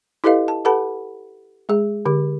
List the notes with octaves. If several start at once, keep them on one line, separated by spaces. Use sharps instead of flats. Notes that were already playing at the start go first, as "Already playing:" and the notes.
E4 G4 A4 B4 D#5 F5
A5
G4 A4 B4 F#5 A5 B5
G#3 G#4
D3 G4